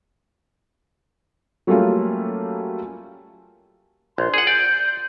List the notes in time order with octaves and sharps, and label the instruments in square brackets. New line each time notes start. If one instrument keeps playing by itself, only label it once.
[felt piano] F#3 G3 A3 A#3 C#4 F4
[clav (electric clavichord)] A#1 [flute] C6
[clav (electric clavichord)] G#4 F#5
[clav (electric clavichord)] D5 [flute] G6